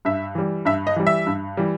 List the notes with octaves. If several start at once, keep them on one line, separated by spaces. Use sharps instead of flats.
G2 E5
E3 G3
G2 E5
D#5
E3 G3
E5
G2
E3 G3